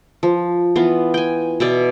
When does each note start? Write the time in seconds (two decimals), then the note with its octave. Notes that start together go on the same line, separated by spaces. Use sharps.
0.23 F3
0.76 E3 B3 F4
1.14 G5 G#5
1.60 B2 E4 D5